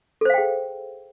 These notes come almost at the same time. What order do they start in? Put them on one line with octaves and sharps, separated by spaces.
A4 C5 F5 G5 G#4